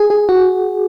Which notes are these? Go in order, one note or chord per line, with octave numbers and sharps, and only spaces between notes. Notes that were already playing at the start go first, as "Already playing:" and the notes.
Already playing: G#4
G#4
F#4